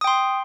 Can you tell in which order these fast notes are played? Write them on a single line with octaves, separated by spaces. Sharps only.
D#6 G5 C6